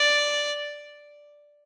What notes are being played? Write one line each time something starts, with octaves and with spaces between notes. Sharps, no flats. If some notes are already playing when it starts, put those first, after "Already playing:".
Already playing: D5